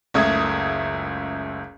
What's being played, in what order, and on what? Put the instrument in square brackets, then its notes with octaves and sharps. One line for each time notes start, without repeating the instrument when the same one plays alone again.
[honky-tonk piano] F#1 C#2 A3 D#6 G#6